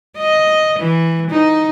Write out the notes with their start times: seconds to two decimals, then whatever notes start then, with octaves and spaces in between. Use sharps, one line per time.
0.18 D#5
0.80 E3
1.31 D#4